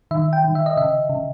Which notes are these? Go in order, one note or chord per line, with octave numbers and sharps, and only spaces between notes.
D#3 E5
G5
D#3
E5
D#5
C#3 E5
C#3